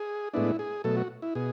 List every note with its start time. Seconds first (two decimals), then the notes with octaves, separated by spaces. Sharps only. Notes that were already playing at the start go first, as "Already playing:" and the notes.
Already playing: G#4
0.34 A2 G#3 B3 D4 E4
0.59 G#4
0.84 B2 F#3 A3 A4
0.97 F#4
1.22 E4
1.35 B2 G#4